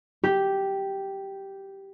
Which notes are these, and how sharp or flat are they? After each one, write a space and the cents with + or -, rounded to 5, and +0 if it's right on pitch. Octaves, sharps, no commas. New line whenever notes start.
G4 -5